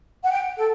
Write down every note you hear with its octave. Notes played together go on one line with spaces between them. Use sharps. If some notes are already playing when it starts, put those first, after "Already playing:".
F#5
G5
A4